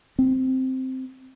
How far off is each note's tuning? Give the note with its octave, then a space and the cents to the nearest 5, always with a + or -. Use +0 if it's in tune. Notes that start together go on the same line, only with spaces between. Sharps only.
C4 -5